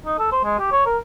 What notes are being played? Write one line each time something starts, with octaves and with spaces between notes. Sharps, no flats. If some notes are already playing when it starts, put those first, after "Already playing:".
D#4
A4
C5
G#3
G4
C#5
A#4